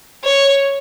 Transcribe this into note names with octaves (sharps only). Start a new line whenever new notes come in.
C#5